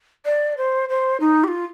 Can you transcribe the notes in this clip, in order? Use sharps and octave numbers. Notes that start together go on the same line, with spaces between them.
D5
C5
C5
D#4
G4
F4